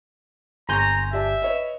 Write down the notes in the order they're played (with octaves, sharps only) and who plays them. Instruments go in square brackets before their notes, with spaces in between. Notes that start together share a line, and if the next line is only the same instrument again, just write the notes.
[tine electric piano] G1 G#5 G6 [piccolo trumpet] A#5 [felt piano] C6 C#6 A#6
[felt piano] G4 D5 A5 [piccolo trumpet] E5
[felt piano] B4 C#5 D#5